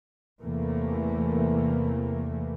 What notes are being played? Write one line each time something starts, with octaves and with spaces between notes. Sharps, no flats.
E2 C3 E3 A3 A#3